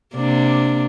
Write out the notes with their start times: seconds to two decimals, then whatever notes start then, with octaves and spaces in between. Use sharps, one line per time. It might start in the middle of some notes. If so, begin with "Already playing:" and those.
0.16 C3 A#3 D4